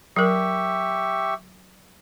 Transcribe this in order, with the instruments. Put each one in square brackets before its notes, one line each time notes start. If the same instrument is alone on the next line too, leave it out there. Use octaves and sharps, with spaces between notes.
[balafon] F#3 A#4 [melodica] G4 E5 C#6